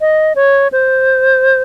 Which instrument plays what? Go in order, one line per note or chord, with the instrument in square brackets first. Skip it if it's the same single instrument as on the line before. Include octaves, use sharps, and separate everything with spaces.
[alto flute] D#5
C#5
C5